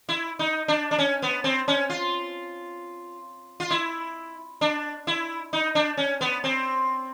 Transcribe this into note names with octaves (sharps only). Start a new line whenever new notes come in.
E4
D#4
D4
D4
C#4
B3
C4
C#4
F4
F4
E4
D4
E4
D#4
D4
C#4
B3
C4